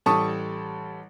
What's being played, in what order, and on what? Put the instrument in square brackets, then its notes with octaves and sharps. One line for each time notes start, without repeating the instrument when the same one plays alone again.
[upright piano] A1 G3 A4 A5 C#6 D#6